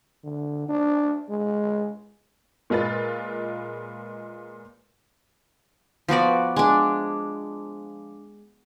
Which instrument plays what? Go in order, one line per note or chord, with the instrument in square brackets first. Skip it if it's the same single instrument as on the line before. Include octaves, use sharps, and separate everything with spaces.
[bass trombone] D3
D4
G#3
[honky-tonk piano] A#2 G#3 F4 B4 A6
[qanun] F3 B3 F#4 D5
G#3 D4